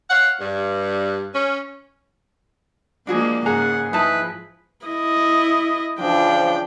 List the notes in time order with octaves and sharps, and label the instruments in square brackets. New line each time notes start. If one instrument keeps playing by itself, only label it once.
[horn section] C#5 F5 F#5
G2
C#4
[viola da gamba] F3 G#3 A#3 [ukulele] D4 F#4 G#4
[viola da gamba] G#2 C#3 [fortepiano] G#4 [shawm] F#5 [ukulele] A#5
[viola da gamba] F3 [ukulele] D#4 E4 A5 [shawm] B4
[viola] E4 D#5
[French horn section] C#3 E3 F3 [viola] D4 G5